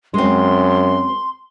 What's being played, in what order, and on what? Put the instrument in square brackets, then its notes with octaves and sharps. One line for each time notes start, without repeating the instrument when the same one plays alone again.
[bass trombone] F#2 [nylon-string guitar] G#3 C4 [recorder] C6